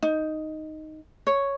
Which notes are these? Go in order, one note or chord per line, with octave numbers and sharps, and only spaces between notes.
D#4
C#5